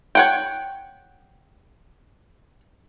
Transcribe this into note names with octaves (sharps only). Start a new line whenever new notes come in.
C#5 F#5 G5